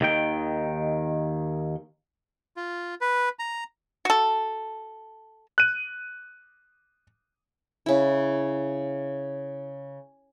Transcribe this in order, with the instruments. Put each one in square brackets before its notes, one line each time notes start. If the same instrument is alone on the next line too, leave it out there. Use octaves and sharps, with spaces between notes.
[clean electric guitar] D#2 D#3 G5
[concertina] F4
B4
A#5
[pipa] F#4 A4
[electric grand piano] F#6 D#7
[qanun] C#3 E4